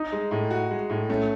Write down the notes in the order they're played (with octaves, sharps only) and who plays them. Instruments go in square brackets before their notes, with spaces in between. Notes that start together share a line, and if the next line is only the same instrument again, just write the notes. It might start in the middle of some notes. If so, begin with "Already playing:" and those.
Already playing: [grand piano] D#4
[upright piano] G#3
A2
F#4
G#3
A2
[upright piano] A3 [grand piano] C#4